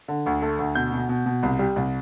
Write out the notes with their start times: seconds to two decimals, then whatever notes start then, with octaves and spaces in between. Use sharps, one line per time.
0.08 D3
0.26 D2
0.42 A3
0.59 D2
0.75 B2 G6
0.93 B2
1.09 B2
1.26 B2
1.43 C2
1.59 G3
1.76 C2